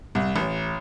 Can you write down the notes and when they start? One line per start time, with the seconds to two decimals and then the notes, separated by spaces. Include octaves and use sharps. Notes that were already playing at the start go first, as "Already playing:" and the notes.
0.15 C2
0.36 A1